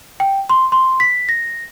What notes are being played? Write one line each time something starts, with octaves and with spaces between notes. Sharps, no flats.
G5
C6
C6
B6
A#6